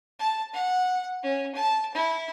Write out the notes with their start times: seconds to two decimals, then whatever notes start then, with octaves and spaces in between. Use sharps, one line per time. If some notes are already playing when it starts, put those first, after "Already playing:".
0.19 A5
0.53 F#5
1.23 C#4
1.55 A5
1.94 E4